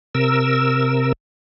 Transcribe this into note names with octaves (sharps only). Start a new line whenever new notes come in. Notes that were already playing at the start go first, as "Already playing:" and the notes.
C3 A#4 E6